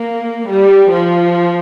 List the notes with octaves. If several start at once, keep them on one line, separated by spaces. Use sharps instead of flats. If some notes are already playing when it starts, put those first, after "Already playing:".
Already playing: A#3
G3
F3